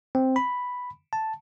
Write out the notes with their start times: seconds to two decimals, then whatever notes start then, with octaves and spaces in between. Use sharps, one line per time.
0.15 C4
0.36 B5
1.13 A5